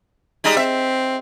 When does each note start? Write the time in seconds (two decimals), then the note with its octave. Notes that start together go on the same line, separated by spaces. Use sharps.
0.44 G3 G#3 D#4
0.57 C4 E5